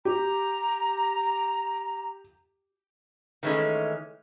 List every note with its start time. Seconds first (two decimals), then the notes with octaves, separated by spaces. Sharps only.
0.05 G4 A#5
3.43 D#3 E3 G#3 A3 C#4